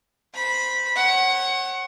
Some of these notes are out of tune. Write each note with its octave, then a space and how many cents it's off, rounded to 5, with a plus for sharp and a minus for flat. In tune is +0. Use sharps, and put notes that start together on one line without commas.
C5 -15 B5 -15
C#5 -35 F#5 +15